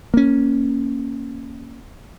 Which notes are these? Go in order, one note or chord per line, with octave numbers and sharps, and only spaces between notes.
A#3 C#4